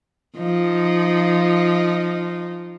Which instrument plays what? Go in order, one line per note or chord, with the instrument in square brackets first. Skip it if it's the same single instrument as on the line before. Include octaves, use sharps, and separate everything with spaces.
[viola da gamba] F3 D#4